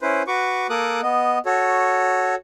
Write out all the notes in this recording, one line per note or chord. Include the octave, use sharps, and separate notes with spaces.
C#4 E4 B4 C5
F#4 B4 C#6 D6
A#3 A4 A#4 D6 D#6 F#6
B3 D#5
F#4 A4 C#5